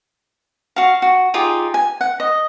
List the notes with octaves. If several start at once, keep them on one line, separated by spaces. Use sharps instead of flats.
F#4 F5
F#4
D#4 F4 G4 G#4
G#5
F#5
D#5